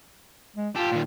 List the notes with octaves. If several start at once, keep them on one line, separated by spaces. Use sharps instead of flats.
G#3
F4 G4 A4
A#2 D#3